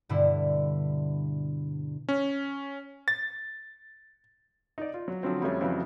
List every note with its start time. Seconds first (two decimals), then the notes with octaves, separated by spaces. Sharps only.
0.09 G2 B2 D3 E4
2.09 C#4
3.08 A6
4.78 D#4 D5
4.94 F4
5.08 F#3
5.23 D3 F3 F#3 C4
5.42 F2 G3 A3 C#4 F4
5.61 F2 C#3 E3 F#3